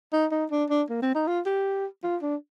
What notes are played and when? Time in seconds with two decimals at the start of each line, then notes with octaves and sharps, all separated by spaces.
0.13 D#4
0.32 D#4
0.51 D4
0.70 D4
0.90 A#3
1.02 C4
1.15 D#4
1.27 F4
1.46 G4
2.04 F4
2.22 D4